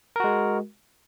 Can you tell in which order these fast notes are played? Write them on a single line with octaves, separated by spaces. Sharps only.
A#4 F#4 G#3